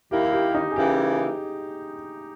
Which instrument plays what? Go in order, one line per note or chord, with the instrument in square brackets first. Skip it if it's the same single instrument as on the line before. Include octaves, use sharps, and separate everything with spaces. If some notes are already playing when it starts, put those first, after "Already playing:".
[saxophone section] D#2 D#3 A#3 E4 [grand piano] G4
[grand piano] G4
D#4
G#4
[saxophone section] C#3 E3 A#3 C#4 E4 [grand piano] G4